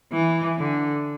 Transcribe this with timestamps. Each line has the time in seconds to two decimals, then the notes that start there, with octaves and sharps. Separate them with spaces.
0.12 E3
0.58 D3